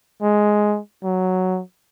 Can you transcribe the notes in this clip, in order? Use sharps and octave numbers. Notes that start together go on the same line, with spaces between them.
G#3
F#3